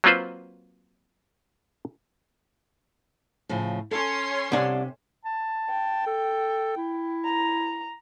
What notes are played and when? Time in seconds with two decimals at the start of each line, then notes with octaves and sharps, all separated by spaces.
0.04 F#3 A#3 C4 F4 B4 C5
3.49 A2 C#3 F3
3.91 C#4 A4 C#5 C6
4.52 C2 C3 D4
5.25 A5
5.69 G5
6.07 A4
6.77 E4
7.25 A#5